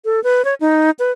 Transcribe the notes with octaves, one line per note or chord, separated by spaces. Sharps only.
A4
B4
C#5
D#4
B4